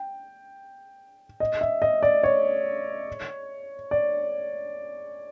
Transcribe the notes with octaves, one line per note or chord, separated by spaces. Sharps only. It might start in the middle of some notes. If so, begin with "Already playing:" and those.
Already playing: G5
D#5
E5
D#5
D5
C#5
D5